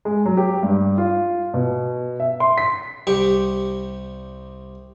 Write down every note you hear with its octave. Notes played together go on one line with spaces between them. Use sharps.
G#3
F#3
G4
G2
F4
B2
E5
C6
B6
C2 G3 G4 C#6